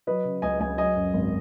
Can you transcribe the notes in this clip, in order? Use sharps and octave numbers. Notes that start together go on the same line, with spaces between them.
F#3 B4 D#5
C#3
C#2 D#5 G#5
C#2 D#5 G#5
F#3 D#5 G#5
F#2
G#1